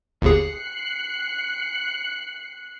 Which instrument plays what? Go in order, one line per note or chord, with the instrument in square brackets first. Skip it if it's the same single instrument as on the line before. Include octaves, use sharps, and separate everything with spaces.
[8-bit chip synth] G1 D#2 G#4 [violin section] F#6 C7 C#7